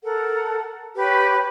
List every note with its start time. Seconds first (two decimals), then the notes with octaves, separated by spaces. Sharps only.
0.03 A4 A#4 F#5
0.95 G4 B4 C#5